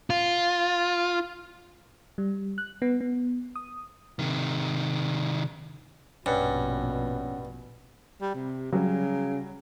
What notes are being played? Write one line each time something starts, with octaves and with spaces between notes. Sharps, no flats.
F4
G3
F#6
B3
B3
D#6
C3 D#3
A#1 G2 B2 C#4 F#5
G3
C3
C#3 F#3 G3